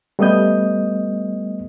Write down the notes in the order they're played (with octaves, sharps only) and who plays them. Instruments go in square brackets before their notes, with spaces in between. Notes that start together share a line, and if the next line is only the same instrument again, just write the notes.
[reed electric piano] G3 A3 B3 D#5 D#6 G6